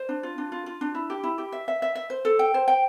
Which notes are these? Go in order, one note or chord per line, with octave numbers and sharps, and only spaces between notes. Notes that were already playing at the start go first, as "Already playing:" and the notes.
Already playing: C5
D4
F4
D4
F4
F4
D4
E4
G4
E4
G4
E5
E5
E5
E5
C5
A4
G5
C5
G5